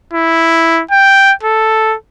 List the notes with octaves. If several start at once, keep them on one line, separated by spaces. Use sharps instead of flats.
E4
G5
A4